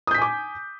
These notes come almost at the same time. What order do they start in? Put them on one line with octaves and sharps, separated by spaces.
D#6 G6 B6 G#5 D6